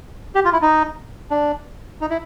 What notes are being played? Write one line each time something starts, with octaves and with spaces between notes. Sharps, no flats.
G4
F4
E4
D#4
D4
D#4
E4